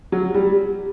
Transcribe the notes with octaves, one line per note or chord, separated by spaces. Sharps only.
F#3
G3